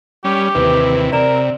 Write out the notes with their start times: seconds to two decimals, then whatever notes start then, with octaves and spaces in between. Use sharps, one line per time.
0.24 G3 C#4 G4
0.55 D#2 C3 E3 B4
1.13 C3 A#4 D5 E7